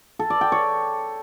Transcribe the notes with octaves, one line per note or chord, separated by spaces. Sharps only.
A4
D5
G5
C#5